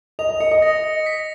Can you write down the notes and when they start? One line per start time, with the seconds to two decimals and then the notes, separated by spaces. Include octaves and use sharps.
0.19 D#5 F7
0.29 D#5
0.40 D#5 C#7
0.51 D#5
0.62 A#6
0.84 A#6
1.06 B6